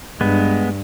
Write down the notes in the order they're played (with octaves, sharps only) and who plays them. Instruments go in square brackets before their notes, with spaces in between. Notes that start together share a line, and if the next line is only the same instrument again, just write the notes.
[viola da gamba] G2 [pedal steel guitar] G#3 B3